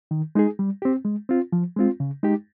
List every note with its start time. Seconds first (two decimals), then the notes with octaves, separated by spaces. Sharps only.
0.11 D#3
0.35 G#3 D#4 G#4
0.59 G3
0.82 C4 G4
1.05 G#3
1.29 C4 F4
1.52 F3
1.76 G#3 C4 F4
2.00 C#3
2.23 G#3 D#4 G4